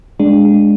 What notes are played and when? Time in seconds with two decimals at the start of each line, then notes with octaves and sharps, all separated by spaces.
0.20 G#3 D4
0.45 G#3